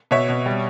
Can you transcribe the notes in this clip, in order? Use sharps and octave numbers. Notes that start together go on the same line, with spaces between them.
B2 C#5 E5
B2
G3